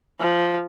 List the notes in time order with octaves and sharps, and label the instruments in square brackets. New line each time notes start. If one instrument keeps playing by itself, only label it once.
[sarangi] F3